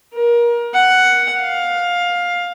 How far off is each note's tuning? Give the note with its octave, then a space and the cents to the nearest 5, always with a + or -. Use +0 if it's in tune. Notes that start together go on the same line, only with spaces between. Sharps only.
A#4 +25
F#5 +5
F5 +15